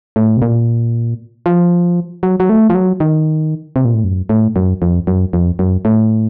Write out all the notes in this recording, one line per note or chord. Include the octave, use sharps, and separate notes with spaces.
A2
C3
A#2
F3
F#3
F#3
A3
F3
F#3
D#3
C3
A#2
A2
F#2
A2
F#2
F2
F#2
F2
F#2
A2